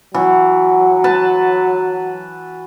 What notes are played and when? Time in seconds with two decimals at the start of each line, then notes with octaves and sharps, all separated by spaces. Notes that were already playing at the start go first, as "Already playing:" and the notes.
0.14 E3 F#3 F#4
1.04 B4 A5